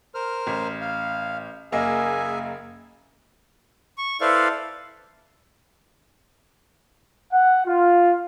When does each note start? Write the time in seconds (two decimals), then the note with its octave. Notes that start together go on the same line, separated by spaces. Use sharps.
0.14 A#4 C5 F6
0.47 A1
0.81 F5
1.72 F#1 A#3 G#4 D#5 E5 G#5
3.98 C#6
4.21 E4 A4 B4 C5 D5 F5
7.32 F#5
7.66 F4